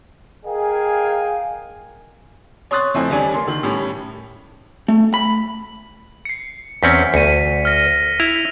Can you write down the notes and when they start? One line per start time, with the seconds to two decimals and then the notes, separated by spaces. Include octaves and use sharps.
0.46 G#4 A#4 D#5 F5 G5 G#5
2.71 C#5 C6 D#6 F#6 A6
2.94 F2 A3 C4 E4 G#5
3.10 D#2 G3 C#4 D4 G#5
3.34 A#3 C6
3.48 D#3
3.63 A2 G3 C#4
4.88 A3
5.14 B5
6.25 C7 C#7
6.83 E2 C4 C#4 B6
7.14 D2 C#7 D#7
7.65 F6 A#6 D#7
8.20 E4 F7